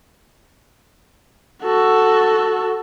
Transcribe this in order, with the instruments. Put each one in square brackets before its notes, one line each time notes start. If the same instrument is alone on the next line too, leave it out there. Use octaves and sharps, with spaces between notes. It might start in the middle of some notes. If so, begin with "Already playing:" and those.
[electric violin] F#4 A4